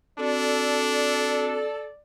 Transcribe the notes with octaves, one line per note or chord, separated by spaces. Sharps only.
C4 D4 F#4 A4 D5